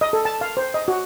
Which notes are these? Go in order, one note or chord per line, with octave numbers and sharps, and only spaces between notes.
D#5
A4
A5
F5
C5
D#5
F#4